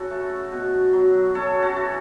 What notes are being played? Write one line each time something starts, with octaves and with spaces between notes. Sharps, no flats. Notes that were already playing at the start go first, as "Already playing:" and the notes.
Already playing: C#3 F#4 A4
A3
B2
F#3
C#3 A4 C#5
F#4 A4
E3